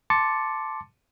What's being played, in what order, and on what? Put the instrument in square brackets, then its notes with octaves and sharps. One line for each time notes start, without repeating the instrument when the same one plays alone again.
[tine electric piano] A5 C6 D6 A6 C#7